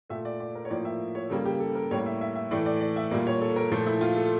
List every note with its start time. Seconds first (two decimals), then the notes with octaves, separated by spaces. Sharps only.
0.10 A#2 A3 E5
0.25 D5
0.40 D5
0.55 A#4
0.65 C#5
0.70 A2 F3 A#3 D5
0.85 E5
1.15 C#5
1.30 C#3 G3 A#3 A4
1.45 G4
1.60 A4
1.75 A#4
1.91 A2 G3 A#3 C#5
2.06 E5
2.21 E5
2.36 E5
2.51 A2 E3 A3 D5
2.66 D5
2.81 D5
2.96 E5
3.11 A#2 G3 A#3 D5
3.27 C#5
3.41 A4
3.56 A#4
3.71 A#2 F3 A3 A4
3.86 E4
4.01 F4
4.17 A4